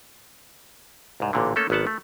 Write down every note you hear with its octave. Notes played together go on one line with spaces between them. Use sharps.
C2 G#2
A1 A#2 D3
A3 A#3 C#4 A4
G#1 F#3 B3 F#5 A5
A3